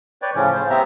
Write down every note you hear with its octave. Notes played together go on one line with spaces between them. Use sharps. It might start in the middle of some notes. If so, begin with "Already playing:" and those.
B4 C#5 D5 G5
A2 C#3 F3 C#4
C5
B3 C4 G4 E5 A#5